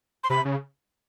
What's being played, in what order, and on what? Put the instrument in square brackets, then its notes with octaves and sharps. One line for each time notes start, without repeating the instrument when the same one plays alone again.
[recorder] C6
[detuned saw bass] C3 [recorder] B5
[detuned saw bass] C#3